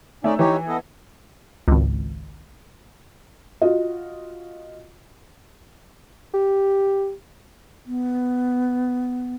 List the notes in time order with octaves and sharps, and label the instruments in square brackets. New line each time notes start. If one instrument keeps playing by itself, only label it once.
[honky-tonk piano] A3 [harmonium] C#4 D#4 D5
[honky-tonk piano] E3 [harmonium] D#4 G4 C#5
[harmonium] B3 A4 D#5
[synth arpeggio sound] G#1 C#2
[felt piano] F4 F#4 D#5
[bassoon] G4
[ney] B3